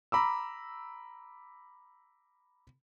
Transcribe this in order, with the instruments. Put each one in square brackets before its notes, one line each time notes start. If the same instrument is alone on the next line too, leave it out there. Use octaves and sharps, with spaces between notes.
[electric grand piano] A#5 B5 D6 E6